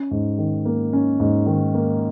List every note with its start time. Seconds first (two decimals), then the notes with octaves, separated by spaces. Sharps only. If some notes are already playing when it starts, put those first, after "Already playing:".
Already playing: C#4
0.11 G#2
0.38 D#3
0.65 A#3
0.93 C#4
1.20 G#2
1.46 D#3
1.75 A#3